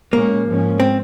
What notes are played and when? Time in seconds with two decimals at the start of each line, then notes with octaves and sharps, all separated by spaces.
0.13 A#2 G#3 A#3 C#4
0.47 G#2 F3 G#3 C#4
0.80 C4